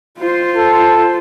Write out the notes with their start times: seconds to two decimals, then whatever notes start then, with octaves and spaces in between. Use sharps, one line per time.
0.19 F4 C5
0.57 A4